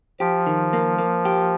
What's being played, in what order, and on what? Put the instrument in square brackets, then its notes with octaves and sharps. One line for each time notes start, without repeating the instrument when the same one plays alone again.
[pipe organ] F3 [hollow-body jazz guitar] G4
[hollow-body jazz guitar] D#3
A#3
A#3
G4